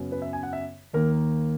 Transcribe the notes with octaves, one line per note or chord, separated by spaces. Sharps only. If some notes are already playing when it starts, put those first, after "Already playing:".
Already playing: F#2 C#3 F#3 B3
B4
E5
G#5
F#5
E5
D#2 D#3 A#3 A#4